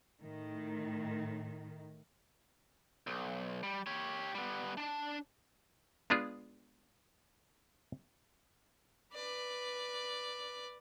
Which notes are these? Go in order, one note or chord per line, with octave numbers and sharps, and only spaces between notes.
A2 D#3
B1
G3
G4 C#5
G3 B3
D4 A5
G#3 B3 D4 F4 G#4
B4 D5